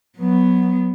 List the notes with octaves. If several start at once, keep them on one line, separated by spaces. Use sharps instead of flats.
F#3 B3